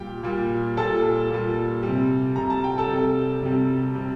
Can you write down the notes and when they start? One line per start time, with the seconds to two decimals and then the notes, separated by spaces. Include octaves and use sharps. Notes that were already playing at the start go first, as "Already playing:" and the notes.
Already playing: A#2 G3 G4 G5
0.23 A#2 G3
0.77 A#2 G3 A4 A5
1.30 A#2 G3
1.83 G3
1.88 C3
2.36 C3 G3 A#5
2.50 A5
2.64 G5
2.78 A4 A5
2.89 C3 G3
3.43 C3 G3
3.95 C3 G3